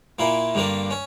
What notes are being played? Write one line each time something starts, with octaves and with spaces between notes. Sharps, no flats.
A#2 A#3 E4
G2 D3 A#3 D4
C#4